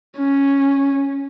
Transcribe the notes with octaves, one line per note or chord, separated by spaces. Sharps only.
C#4